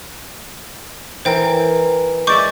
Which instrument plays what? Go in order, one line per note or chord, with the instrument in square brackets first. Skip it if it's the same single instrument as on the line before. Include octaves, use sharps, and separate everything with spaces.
[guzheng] E3 A#4 [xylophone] C5 G5
[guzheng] G#3 D5 E5 [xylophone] C#6 D6 G6